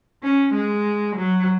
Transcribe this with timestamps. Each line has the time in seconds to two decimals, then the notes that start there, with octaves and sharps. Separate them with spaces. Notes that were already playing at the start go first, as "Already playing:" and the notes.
0.23 C#4
0.54 G#3
1.16 F#3